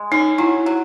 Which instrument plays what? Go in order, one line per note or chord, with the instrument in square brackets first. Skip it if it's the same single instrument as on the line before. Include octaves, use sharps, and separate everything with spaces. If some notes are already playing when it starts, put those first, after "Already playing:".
Already playing: [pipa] G#3
[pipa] C#4 [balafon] D#4
[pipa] F#3 [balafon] E4
[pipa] F#3